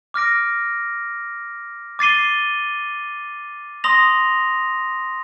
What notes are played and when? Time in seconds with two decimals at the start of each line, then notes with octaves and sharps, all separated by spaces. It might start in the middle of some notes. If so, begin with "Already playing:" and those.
0.14 D6 F6 A#6 D7
1.99 D6 A6 C7 D#7 G7
3.84 C6 D#6 A#6 F7